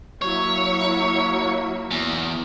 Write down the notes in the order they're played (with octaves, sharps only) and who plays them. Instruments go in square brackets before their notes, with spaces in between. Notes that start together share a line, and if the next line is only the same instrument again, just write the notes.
[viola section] F#3 A#3 E4 [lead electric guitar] C#5
[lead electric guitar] E2